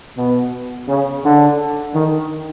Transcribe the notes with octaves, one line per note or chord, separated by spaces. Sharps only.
B2
C#3
D3
D#3